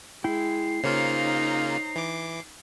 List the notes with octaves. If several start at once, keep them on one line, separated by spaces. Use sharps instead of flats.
G#3 E4 G5 C7
C#3 A#3 D#4 F4 C5 C#5 A#5
E3 D6